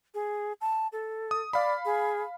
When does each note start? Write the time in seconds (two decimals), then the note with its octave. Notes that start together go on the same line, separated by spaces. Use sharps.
0.14 G#4
0.61 A5
0.92 A4
1.31 D#6
1.53 D5 F5 B5
1.85 G#4